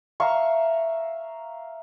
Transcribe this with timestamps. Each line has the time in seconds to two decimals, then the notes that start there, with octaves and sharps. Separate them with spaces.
0.20 E5 F5 A#5 C#6